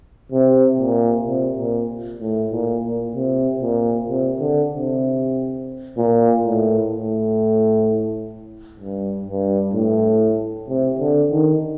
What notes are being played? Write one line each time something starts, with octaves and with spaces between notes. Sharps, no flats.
C3
A#2
C3
A#2
A2
A#2
A#2
C3
A#2
C3
D3
C3
A#2
A2
A2
G2
G2
A2
C3
D3
D#3